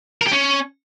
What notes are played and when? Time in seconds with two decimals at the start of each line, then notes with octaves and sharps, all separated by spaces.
0.21 A#4
0.27 G4
0.32 C#4